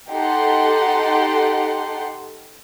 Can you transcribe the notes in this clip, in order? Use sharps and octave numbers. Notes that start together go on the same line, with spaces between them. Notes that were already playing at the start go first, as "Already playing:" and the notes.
D#4 G4 A4 F#5 C6